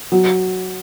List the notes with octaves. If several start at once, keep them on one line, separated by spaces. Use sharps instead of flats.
F#3